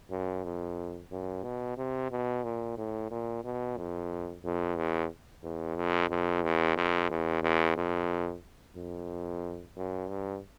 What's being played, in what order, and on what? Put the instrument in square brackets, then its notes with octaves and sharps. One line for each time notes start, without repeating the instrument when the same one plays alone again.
[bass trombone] F#2
F2
F#2
B2
C3
B2
A#2
A2
A#2
B2
F2
F2
E2
E2
F2
F2
E2
F2
E2
E2
F2
F2
F#2
G2